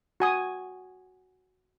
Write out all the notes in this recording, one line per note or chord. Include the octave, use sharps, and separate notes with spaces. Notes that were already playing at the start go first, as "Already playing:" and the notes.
F#4 G#5 D#6